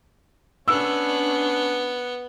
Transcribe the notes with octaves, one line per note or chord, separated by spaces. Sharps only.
B3 C#4 D4 E6